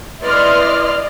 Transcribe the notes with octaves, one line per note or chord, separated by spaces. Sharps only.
E4 B4 D5 D#5 C6 F6